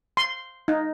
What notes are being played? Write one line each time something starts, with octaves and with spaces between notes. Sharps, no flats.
C6
D#4